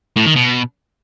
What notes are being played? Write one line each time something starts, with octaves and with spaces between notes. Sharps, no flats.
A2
D#3
B2